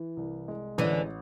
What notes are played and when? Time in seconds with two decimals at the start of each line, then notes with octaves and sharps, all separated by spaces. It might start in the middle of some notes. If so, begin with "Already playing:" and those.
Already playing: E3
0.17 C2
0.48 G#3
0.78 A1 D3 E3